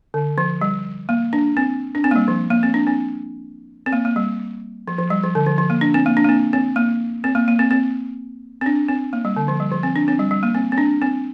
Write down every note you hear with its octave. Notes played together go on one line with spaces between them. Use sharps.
D3
F3
G3
A#3
D4
C4
D4
C4
A#3
G3
F3
A#3
C4
D4
C4
C4
A#3
A#3
G3
F3
F3
G3
F3
D3
F3
F3
A#3
D4
C4
A#3
D4
A#3
C4
C4
A#3
C4
A#3
A#3
C4
C4
C4
D4
C4
A#3
G3
D3
F3
G3
F3
C4
D4
C4
G3
G3
A#3
C4
C4
D4
C4